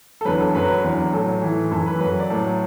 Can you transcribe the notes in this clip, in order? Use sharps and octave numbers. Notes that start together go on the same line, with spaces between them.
A4
E2 D3 F#3 B4
A4
F#2 F#3 B4
E2 D3 F#3
A2 F#3 A4
A2 E3
F#2 E3 A4
B4
F#2 F#3 B4
D5
A2 F#3 A4